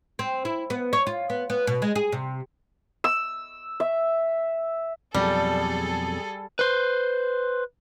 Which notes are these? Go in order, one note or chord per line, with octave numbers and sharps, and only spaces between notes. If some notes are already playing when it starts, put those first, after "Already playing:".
C4
E4
B3
C#5
F4
B3
B3
B2
G#3
G#4
C3
E6
E5
F2 B2 F#3 G3 G#4 A4
B4 C5